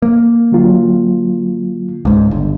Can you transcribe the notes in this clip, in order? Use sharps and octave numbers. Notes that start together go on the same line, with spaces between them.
A#3
D3 F#3 F4
C#2 G#2
G1